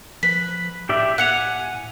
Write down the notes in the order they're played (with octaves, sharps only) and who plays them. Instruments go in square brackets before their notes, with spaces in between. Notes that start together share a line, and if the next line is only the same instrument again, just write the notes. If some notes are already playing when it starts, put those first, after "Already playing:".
[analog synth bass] F3 [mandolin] B4 [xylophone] B6
[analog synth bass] A2 [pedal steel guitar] G4 D5 E5
[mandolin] F#5 [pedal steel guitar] G#5 [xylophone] F#6 C#7 F7